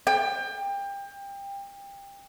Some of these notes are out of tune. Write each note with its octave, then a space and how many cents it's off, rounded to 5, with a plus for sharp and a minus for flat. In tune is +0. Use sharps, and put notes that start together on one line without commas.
G5 +25